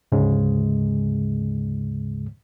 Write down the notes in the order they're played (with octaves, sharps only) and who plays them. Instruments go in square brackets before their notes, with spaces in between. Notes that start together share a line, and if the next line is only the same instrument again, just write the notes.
[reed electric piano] D2 G#2 C#3 G#3